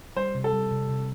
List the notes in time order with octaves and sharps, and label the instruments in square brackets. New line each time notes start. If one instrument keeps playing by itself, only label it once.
[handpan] G3 [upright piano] C5
[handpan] C3
[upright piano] A4
[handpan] G3
C3
C3